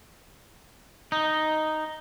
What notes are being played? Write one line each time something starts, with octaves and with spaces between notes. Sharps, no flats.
D#4